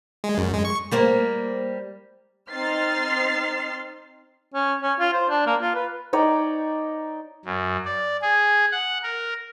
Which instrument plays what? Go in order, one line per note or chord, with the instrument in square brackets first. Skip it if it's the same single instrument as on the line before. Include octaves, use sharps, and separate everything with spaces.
[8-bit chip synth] G#3
F#2
G#3
C#6
[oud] G3 A#3 C5
[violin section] C4 D#4 C6 F6 A6 C7
[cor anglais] C#4
C#4
F4
C5
D4
A#3
F4
B4
[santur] D#4 C#5 D5 G5
[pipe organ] F#2
D5
G#4
F#5
A#4